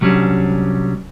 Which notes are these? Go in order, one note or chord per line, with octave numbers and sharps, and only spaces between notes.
C2 F#3 G3 C#4 D4